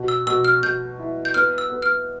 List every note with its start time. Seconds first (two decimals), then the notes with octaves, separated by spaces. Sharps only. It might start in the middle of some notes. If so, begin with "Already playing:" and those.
Already playing: B2
0.08 E6
0.27 B2 E6
0.45 F6
0.63 B2 G6
0.99 E4
1.25 G6
1.34 B3 F6
1.58 E6
1.70 B3
1.82 F6